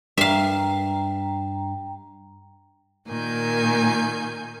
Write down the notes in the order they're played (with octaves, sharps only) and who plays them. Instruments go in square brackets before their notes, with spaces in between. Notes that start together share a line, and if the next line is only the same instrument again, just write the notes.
[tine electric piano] G2 [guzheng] E5 F5 [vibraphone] G5 A#5
[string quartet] A#2 D#3 G#5 G6